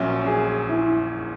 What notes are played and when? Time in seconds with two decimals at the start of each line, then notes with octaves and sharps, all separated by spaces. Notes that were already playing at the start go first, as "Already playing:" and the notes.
Already playing: A#1 A#2 F#3 C#4 E5
0.27 G#4
0.69 E4